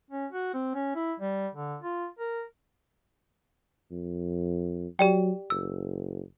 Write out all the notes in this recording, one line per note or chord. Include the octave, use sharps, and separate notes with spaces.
C#4
F#4
C4
C#4
E4
G3
D3
F4
A#4
F2
F#3 G4 D5 G5
F#1 E6